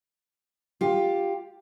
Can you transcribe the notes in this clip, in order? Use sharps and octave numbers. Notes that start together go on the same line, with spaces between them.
F4 G4